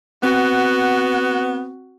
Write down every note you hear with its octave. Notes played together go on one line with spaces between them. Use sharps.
B3 C4 F#4